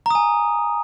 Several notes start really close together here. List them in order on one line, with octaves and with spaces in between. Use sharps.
A#5 D#6 G#5